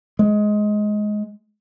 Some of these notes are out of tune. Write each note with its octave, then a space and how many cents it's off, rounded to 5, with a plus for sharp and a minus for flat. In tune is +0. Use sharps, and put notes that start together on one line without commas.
G#3 +15